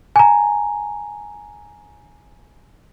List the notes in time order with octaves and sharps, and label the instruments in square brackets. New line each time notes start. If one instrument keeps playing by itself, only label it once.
[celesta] G#5 A#5